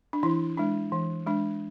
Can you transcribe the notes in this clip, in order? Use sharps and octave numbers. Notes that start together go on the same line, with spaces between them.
D4
E3 E4
G#3 D4
E3
G#3 D4